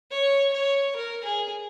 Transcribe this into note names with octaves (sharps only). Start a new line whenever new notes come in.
C#5
C#5
A#4
G#4